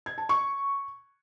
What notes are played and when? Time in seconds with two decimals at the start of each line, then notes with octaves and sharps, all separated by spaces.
0.06 G#6
0.18 A5
0.29 C#6